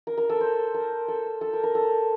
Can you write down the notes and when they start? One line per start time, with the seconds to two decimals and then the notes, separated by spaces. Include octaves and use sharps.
0.07 A#4
0.17 A#4
0.30 A4
0.41 C5
0.74 A#4
1.08 A4
1.41 A4
1.53 A#4
1.63 A#4
1.75 A4